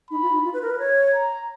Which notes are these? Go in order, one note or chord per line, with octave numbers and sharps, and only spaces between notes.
D#4 B5
F4
D#4
F4
B4
A#4
B4
C#5
A#5